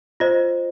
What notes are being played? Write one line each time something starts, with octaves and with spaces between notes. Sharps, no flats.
F4 C5 D#5